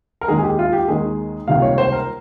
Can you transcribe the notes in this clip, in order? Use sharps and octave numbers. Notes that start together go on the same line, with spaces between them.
A#4
D#2 D#3 G#3 G#4
G#4
G4
F4
G4
D#2 D#3 G#3 G#4
C#2 C3 D#3 G3 A#3 F5
C#5
C5
A#4